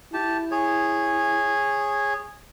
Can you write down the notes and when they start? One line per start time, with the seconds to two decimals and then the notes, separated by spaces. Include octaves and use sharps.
0.13 E4 G4 A5
0.51 G#4 C#5